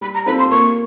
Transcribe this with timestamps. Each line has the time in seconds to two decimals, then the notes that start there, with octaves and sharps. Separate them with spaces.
0.01 G3 B5
0.14 A#5
0.26 C4 F4 A4 C5 B5
0.39 C6
0.50 A#3 C#6